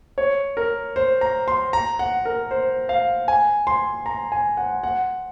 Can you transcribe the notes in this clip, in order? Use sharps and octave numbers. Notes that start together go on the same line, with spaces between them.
C#5
A#4
C5
A#5
C6
A#5
F#5
A#4
C5
F5
G#5
C6
A#5
G#5
F#5
F#5